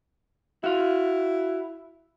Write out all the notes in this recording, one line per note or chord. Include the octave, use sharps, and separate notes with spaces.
E4 F#4 F5